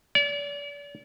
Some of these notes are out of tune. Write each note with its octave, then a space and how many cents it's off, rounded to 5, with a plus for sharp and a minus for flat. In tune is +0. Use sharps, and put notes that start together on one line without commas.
D5 -40